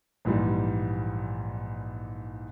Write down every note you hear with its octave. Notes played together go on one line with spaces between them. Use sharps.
A#1 G#2 E3 G3